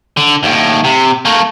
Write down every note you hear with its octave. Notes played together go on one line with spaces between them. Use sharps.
D3
D#2 A2
C3
A3 A#3